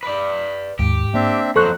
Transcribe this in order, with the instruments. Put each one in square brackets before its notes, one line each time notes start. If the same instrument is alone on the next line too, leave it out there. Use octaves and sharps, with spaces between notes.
[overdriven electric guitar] B4 D5
[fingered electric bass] D#2 [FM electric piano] G#2 [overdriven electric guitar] G4
[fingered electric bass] A#3 [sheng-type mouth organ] C4 D4 E5
[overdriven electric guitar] F2 F#3 [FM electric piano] A4 C#6 F#6 [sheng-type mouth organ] C5